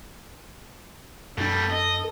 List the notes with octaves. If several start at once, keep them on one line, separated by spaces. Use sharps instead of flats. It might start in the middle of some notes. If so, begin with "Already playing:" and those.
F#2 B2 G3 D4 A4
D#5